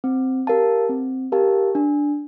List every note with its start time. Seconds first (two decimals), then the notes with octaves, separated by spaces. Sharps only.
0.04 C4
0.47 G4 A#4 F5 A5
0.89 C4
1.32 G4 A#4 F5 A5
1.75 D4